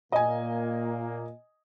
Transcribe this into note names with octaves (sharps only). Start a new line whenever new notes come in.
A#2 A#3 D#5 G#5